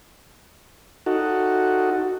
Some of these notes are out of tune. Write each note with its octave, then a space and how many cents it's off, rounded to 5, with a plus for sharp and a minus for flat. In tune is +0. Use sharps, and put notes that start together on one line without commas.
D#4 +0 F#4 +0 A4 +10